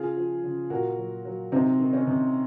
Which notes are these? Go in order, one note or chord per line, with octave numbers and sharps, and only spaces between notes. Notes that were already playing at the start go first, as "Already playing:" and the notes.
Already playing: C#3 F4 G#4
F3
C#3
A#2 F#4 A#4
F#3
F#3
C3 C4 D#4
D#3
C#4
C3